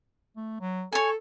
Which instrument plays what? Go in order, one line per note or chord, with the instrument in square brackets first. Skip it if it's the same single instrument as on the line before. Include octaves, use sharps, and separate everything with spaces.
[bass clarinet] A3
F#3
[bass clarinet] A4 [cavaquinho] C#5 G#5